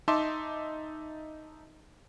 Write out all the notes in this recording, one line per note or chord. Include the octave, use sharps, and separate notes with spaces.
D#4 E5 A5 C6 D6